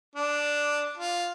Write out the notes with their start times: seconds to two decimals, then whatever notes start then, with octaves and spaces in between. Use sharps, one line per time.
0.15 D4
0.97 F4